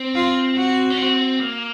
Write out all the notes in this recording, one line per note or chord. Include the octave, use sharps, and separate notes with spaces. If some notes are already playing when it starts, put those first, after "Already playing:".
Already playing: C4
F4
F#4
C#4
C4
A#3